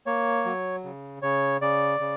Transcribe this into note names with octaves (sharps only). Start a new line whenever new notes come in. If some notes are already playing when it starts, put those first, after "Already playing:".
A#3 C#5
F#3
C#3
C#3 C#5
C#3 D5
C#3